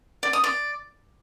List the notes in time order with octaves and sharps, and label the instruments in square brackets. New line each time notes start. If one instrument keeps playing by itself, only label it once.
[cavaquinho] D5
D#6
D5